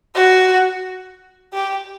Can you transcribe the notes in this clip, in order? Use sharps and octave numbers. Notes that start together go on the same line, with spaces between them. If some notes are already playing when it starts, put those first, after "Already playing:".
F#4
G4